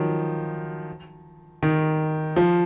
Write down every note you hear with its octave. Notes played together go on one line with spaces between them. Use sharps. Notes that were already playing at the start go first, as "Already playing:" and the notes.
Already playing: D#3 F3 F#3
D#3
F3